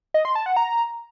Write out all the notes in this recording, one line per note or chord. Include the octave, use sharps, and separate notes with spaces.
D#5
C6
A5
F#5
A#5